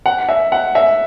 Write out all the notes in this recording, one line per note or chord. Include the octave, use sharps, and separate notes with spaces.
F#5
E5
F#5
E5